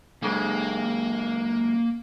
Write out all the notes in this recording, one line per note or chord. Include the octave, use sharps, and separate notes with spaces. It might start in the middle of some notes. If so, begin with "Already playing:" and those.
F#2 C#3 G#3 A#3